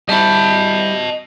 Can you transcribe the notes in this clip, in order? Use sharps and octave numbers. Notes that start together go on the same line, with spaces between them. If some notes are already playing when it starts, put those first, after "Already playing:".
G3 E4 D#5 A5